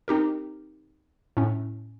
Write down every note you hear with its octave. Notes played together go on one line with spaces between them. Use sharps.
C4 D#4 G4 A#4
A2 C#4